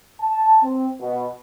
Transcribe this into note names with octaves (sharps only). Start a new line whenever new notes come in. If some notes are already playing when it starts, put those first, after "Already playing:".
A5
C4
B2